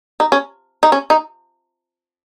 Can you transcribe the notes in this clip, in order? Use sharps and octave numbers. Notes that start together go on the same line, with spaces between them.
D#4
C#4
D#4
C#4
D#4